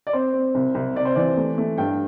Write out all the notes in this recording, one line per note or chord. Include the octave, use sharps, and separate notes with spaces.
D5
C4 C5
C4
C2
C2
C3 D5
C5
E3 D5
A3
A3
G2 G5